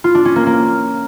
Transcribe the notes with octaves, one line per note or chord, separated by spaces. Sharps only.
F4
D4
C#4
A#3
A#3